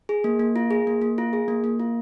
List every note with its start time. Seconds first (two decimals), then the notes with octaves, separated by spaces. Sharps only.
0.09 G#4
0.24 A#3
0.39 A#3
0.56 F4
0.71 G#4
0.87 A#3
1.02 A#3
1.18 F4
1.33 G#4
1.48 A#3
1.64 A#3
1.80 F4